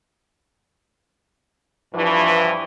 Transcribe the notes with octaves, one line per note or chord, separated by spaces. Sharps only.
G2 E3 F3